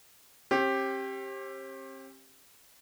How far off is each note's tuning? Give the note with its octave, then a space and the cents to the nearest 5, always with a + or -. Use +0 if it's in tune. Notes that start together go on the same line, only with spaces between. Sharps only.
C4 +45 G4 +0